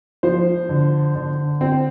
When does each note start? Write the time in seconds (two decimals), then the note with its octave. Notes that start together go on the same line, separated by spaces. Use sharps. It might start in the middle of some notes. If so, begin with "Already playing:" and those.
0.23 F3 C5
0.69 D3
1.15 D3
1.61 C4